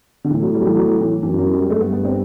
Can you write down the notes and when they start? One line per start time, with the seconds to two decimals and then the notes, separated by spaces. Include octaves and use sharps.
0.24 D3
0.30 A2 E3
0.42 F#3
0.54 G3
0.61 F#3
0.65 E3
0.77 F#3
1.00 E3
1.23 F#2 E3
1.39 F#3
1.53 G3
1.69 G2 A3
1.81 B3
1.92 B3
2.05 C4